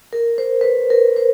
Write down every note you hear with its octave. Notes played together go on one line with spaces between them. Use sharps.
A#4
C5
B4
C5
A#4
C5